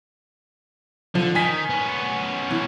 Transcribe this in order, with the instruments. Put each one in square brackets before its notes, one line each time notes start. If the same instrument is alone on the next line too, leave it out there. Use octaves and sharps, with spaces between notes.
[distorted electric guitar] D3 [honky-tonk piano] F3
[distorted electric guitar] D#3 [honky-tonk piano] G#5 B6
[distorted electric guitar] B3 C#4
[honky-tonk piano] E3